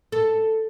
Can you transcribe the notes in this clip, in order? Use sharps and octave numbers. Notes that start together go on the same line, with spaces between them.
A4